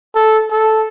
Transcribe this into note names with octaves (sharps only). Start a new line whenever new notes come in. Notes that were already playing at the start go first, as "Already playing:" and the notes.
A4
A4